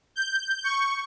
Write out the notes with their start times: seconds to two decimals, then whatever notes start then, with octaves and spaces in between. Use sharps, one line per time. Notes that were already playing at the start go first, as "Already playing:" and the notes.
0.16 G6
0.64 C#6